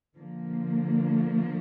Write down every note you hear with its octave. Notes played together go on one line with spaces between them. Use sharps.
D3 F3 A#3